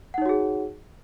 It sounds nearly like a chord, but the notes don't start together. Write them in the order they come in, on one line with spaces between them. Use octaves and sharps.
F#5 D#4 C#5 F#4 G#4